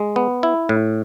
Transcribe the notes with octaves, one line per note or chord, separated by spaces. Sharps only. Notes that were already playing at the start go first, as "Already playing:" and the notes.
Already playing: G#3
B3
E4
A2